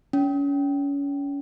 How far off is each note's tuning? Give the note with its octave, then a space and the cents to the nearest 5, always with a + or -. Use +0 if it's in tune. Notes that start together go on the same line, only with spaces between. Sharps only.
C#4 +30